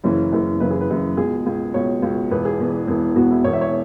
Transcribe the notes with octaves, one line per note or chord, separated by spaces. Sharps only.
F#1 F#2 C#3 E3 C#4
F#1 F#2 C#3 E3
F#1 F#2 C#3 E3 B4
G#4
B4
F#1 F#2 C#3 E3
C#2 B2 G#4
C#2 B2
C#2 B2 C#5
C#2 B2
E1 E2 E3 B4
G#4
E1 E2 E3
E1 E2 E3
E1 E2 E3 F#4
E4
E1 E2 E3 C#5
E5
C#5